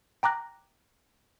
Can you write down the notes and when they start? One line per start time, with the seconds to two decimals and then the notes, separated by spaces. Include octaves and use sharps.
0.23 G5 A#5 D6 F#6 A#6